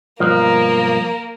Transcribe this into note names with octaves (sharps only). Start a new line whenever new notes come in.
B1 G2 F3 A#3 A#4